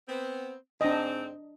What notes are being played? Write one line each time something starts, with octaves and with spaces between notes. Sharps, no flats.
B3 C4
G#2 C4 D4 D#5